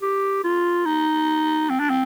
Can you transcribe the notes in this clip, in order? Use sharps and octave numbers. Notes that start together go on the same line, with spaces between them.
G4
F4
D#4
C4
D4
C4